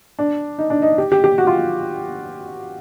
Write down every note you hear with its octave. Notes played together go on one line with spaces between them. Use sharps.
D4
D#4
D4
D#4
G4
G4
G4
F#4
F4